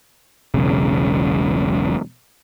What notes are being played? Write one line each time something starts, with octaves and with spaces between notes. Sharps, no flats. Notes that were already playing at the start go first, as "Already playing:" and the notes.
E1 B1 C#3